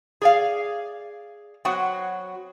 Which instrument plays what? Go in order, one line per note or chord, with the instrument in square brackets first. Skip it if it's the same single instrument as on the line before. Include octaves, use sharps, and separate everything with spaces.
[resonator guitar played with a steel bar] G#4 D5 F5
F#3 B3 C4 F#4 F#5